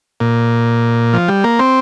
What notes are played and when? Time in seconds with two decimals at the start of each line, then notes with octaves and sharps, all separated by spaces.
0.20 A#2
1.13 F3
1.28 G3
1.44 A#3
1.59 C4